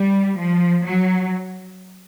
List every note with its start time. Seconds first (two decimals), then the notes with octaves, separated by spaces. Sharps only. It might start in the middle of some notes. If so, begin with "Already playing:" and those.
Already playing: G3
0.38 F3
0.86 F#3